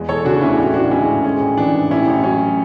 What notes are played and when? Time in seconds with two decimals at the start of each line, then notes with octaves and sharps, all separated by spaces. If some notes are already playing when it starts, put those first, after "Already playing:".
Already playing: E2 G#3
0.09 E1 A4 C#5
0.25 C#3 D4 F#4
0.41 D2 C#4 E4
0.58 A1 F#4
0.67 E4
0.74 A1 D4 F#4
0.91 G#3 C#4 E4
1.09 G#2
1.24 G#3 C#4
1.41 A1
1.57 E3 D4
1.75 G#2
1.91 A1 C#4 E4
2.08 A1
2.23 F#3 C#4